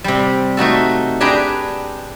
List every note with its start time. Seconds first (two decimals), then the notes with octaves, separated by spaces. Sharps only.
0.04 C3 G3
0.57 A3 D#4 F#4 A4
1.21 D4 G4 G#4 B4 G5 A#5